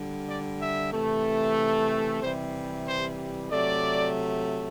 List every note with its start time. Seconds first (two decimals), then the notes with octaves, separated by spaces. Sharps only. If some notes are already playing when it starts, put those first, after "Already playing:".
Already playing: D3 G3
0.28 D5
0.61 E5
0.92 C3 E3 A3
2.22 C3 E3 G3 C5
2.87 C5
3.51 C3 F#3 A3 D5